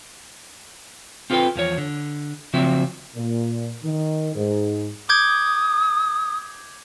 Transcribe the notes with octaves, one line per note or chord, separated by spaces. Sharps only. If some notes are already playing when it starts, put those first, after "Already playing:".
C4 F4 G4 A4 B4 G5
E2 F3 C#5
D3
C#3 F3 F#3 C4 E5
A#2
D#3
G#2
D6 D#6 G6 G#6